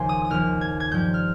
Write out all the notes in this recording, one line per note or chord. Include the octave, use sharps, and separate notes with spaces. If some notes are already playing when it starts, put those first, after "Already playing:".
Already playing: D#2 C#3 F3 G#5 C6
D#6
D#6
D#2 C#3 F3 F6
G#6
G#6
G2 F3 G6
F6